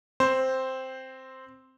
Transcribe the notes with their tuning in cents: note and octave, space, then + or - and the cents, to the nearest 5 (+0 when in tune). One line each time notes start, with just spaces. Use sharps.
C4 +0 C5 +0